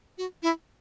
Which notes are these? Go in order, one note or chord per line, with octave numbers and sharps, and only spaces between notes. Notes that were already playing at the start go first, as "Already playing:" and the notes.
F#4
E4